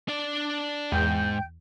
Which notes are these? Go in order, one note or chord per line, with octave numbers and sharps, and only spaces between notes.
D4 D5
E2 G#2 G5 G6